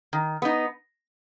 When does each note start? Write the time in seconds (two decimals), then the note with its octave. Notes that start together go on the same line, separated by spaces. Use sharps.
0.13 D#3
0.42 B3 D#4